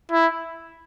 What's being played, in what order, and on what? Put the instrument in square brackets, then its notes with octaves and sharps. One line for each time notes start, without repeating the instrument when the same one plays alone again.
[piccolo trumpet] E4